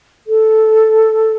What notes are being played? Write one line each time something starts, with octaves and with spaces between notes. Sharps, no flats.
A4